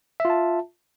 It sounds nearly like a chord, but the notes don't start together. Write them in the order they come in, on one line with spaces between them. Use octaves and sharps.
E5 F4 A5